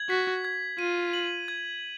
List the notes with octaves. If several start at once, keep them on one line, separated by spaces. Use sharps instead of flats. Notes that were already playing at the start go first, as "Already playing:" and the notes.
Already playing: G#6 F#7
F#4 B6
G#6
F4 D#7
F#7
G#6